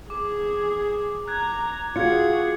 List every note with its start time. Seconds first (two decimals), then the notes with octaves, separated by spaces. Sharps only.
0.10 G#4 D6
1.28 A#5 F#6 G#6
1.96 F4 F#4 G#4 G#6 C#7